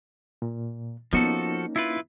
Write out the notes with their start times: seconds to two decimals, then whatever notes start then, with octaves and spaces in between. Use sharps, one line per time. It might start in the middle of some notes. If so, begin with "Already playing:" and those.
0.42 A#2
1.13 F3 A#3 B3 C#4 D#4 F#4 A4
1.76 E4 F4 B4